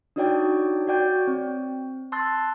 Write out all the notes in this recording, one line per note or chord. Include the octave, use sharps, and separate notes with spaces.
D4 D#4 F#4 C#5 D5 G5
F#4 C#5 D5 G5 G6
C4
A5 C6 E6 F#6 A6